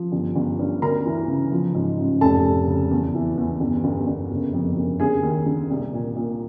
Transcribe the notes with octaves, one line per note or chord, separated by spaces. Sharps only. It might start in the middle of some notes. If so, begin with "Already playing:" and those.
Already playing: F3
G1
G1
G2
D2 A#4 A#5
E3
C#3
F3
G#2
A1
F1 A4 A5
F1
C#3
E2
E3
E2
G1
G1
G1
F#1
F2
F#1
D3 G#4 G#5
D#2
D3
C2
A#2
A#2